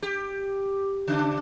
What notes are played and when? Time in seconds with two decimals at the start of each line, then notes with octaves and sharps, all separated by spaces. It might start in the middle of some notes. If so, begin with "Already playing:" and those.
0.02 G4
1.07 C#3 D4